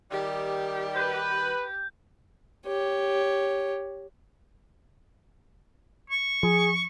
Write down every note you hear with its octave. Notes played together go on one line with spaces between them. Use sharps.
D#3 G3 G4
B4 G6
G4 C#5
C#6
F3 G#4